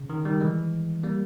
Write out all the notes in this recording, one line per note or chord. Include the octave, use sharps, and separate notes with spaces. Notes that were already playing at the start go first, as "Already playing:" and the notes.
Already playing: C#3
D#3
D#3 G3
E3 G#3
G3 A#3